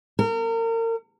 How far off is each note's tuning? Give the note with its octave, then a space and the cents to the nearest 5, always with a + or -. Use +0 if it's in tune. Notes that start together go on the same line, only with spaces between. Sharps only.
A#4 -35